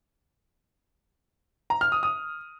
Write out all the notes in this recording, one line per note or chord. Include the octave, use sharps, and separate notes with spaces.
A#5
F6
D#6
D#6